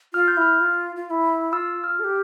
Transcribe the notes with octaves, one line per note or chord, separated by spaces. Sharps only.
F4 F6
G6
E4 F6
F4
F4
F4
E4
F4 E6
F6
A4
G4